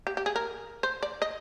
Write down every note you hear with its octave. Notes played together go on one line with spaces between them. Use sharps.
G4
G4
G#4
A#4
C5
D5
D#5